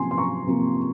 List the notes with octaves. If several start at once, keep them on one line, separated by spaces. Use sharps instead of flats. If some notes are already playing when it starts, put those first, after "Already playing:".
Already playing: C3 F3 A#3 G#5 C6
C6
A#5 C#6
C3 F3 A#3